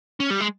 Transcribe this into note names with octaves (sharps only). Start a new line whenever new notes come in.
C#4
G3
G#3